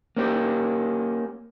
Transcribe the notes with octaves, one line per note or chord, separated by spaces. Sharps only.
A#3 C#4 G4